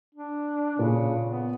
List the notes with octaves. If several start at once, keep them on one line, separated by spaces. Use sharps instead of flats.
D4
A#2 C#3
B3